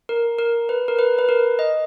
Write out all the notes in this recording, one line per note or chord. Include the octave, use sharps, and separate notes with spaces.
A#4
A#4
B4
A#4
B4
B4
A#4
D#5